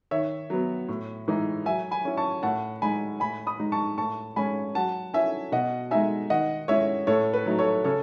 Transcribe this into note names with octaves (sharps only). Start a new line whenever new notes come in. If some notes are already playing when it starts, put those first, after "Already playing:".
D#3 C#5 E5
F#3 B3
A2
E3 G#3 D#4
F#3 E5 G#5
G#5 B5
C#4 E4
A5 C#6
A2 F#5 A5
G#3 D#4 G#5 B5
A2 G#5 B5
B5 D#6
G#3 D#4
A5 C#6
A2 A5 C#6
G#3 C#4 G#5 B5
F#3 F#5 A5
C#4 E4 E5 G#5
B2 D#5 F#5
G#3 D#4 E5 G#5
D#3 D#5 F#5
G#3 C#4 E4 C#5 E5
A2 A4 C#5
B4
F#3 A3 D#4
A4 C#5
C#3 A4 C#5